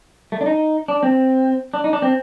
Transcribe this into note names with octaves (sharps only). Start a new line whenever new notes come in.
A3
D4
D#4
D4
C4
D4
D#4
D4
C4